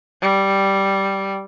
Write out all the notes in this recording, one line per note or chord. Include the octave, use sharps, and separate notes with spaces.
G3